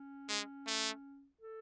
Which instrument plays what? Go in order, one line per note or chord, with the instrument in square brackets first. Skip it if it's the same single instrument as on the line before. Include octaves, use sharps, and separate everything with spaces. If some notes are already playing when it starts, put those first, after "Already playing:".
Already playing: [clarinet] C#4
[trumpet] G#3
A3
[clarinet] A4